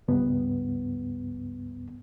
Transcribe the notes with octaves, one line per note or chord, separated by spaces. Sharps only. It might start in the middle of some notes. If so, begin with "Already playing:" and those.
C#2 G2 B3